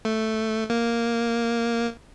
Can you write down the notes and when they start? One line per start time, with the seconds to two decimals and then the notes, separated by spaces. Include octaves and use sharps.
0.05 A3
0.70 A#3